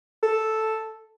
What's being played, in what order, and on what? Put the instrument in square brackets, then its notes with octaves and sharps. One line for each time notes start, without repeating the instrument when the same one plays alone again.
[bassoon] A4